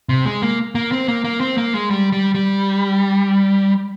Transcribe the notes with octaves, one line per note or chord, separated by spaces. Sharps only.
C3
G#3
A#3
A#3
C4
A#3
A#3
C4
A#3
G#3
G3
G3
G3